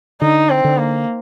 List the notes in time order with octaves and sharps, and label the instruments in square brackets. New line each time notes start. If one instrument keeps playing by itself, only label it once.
[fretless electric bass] D3 [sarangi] D#4
[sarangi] C4
[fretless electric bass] D3
[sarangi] A#3